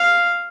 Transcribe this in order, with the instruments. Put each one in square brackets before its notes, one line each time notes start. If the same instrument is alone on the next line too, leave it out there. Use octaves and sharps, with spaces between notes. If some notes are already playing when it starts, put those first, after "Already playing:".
Already playing: [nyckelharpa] F5